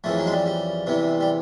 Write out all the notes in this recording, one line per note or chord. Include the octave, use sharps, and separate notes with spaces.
F2 C#3 E3 A3
F#3
G#3
G3
G3
E2 C3 E3
G3